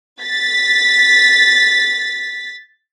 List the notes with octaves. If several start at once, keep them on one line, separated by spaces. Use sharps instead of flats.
A6 B6